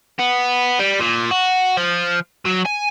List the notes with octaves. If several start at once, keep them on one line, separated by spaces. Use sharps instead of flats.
B3
G3
A#2
F#4
F3
F#3
G#5